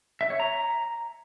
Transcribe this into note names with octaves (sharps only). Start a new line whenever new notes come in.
E5
C#5
A#5